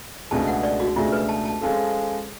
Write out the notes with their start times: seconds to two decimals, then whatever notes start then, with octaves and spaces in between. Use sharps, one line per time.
0.31 C#2 B2 A3 D4 G#4 A5
0.47 F#5
0.63 D5
0.80 F#4
0.96 C#2 B2 A3 D4 F4 G#4
1.12 B4
1.29 A5
1.45 A5
1.61 F3 G#3 C#4 F4 A4